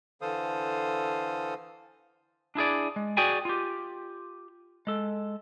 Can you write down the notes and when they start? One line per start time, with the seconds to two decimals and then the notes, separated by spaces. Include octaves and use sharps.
0.21 D3 E3 A4 C5 F5 D#6
2.55 D4 E4 G#4 D5
2.96 G#3
3.17 F#4 G#4 D5 G5 G#5
3.45 F4 G4
4.87 G#3 A4